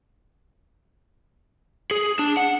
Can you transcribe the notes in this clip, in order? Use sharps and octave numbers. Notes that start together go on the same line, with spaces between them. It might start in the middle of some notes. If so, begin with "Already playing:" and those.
G#4
D4
F#5